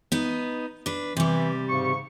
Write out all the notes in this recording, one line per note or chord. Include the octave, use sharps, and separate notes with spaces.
B3 D#4
D4 B4
C3 E3 G3
G#2 C#3 C#6